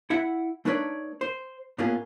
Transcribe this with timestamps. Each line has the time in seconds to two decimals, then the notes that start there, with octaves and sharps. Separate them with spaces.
0.10 E4 E5 F#5
0.65 A3 D4 D#4 B4 C#5 D5
1.21 C5
1.78 A2 A#3 B3 C#4 F4 G#4